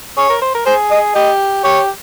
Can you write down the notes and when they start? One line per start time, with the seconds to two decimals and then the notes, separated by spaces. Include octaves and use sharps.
0.17 G#4 C#5
0.30 A#4
0.42 C5
0.55 A#4
0.66 G#4 C5
0.91 D#5
1.15 G4 D#5
1.64 G4 C#5